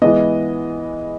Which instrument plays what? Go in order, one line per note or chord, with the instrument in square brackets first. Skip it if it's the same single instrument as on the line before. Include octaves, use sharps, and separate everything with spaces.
[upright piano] E3 G#3 B3 D#5